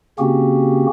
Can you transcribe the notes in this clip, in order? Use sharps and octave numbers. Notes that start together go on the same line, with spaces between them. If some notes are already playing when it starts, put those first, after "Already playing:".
C#3 A#3 C4 C#4 F#4 G4